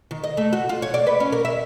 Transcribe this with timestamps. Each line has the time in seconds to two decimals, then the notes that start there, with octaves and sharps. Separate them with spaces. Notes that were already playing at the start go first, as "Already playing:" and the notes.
0.11 D#3
0.24 D#5
0.37 A3
0.53 F#4
0.69 F4
0.82 C#5
0.94 D5
1.07 B4
1.20 C#4
1.32 A#4
1.45 E5